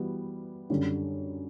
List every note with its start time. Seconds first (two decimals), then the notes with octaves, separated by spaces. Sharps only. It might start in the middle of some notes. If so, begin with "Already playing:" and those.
Already playing: E3 G3 B3 F#4
0.70 F#2 D3 G3